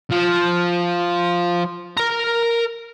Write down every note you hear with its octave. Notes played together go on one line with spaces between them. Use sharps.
F3
A#4 A#5